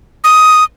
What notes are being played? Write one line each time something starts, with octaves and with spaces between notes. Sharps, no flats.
D#6